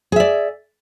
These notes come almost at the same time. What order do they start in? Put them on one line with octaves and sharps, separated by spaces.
G#4 E5 D5